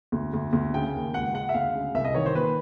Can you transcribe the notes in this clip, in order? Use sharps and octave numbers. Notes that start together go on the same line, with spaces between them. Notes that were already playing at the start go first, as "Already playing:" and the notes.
D2
D2
D2
C#3 G5
D#2
C#2 F#5
G#3 F#5
E5
D2 F5
C#3
C2 E5
D#5
D#3 C#5
C5
A#2 B4